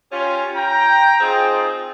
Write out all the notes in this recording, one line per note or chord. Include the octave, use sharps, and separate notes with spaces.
C#4 F4 G4
G5 A#5
C4 D#4 F4 G#4